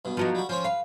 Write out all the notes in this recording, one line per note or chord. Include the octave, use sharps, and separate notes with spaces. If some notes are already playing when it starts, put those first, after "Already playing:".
G2 B2
F3 F#3 D#4
G3 F#4
F3 C#4 C5 C#5
B4 F5